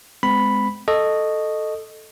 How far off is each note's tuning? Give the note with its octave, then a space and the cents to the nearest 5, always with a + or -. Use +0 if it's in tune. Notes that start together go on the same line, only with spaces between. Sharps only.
G#3 +5 C4 -40 B5 +0
A4 +0 D#5 -10 C#6 +0